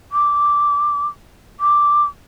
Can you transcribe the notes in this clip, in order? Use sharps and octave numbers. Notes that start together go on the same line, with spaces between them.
D6
D6